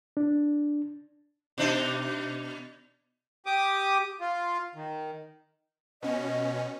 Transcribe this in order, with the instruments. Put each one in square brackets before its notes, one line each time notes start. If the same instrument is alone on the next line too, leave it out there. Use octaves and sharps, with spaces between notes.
[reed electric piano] D4
[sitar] B2 D4 D#4
[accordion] G4 D6 D#6
F4
D#3
[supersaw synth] B2 C#4 [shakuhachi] D#5